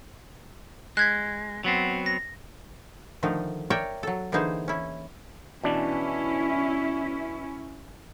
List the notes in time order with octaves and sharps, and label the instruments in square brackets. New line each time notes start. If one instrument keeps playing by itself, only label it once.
[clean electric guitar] G#3 [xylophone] F#6 G#6 B6
[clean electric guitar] F#3 B3 C4
[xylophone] A#6
[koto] D3 D#3 F3 A3 D#4
A#4 C#5 D5 E5 G5
F#3 A4
D3 E3 A#3 D#4 G#4 C5
C#4 E4
[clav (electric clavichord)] B2 E3 D4 [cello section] C#4 E4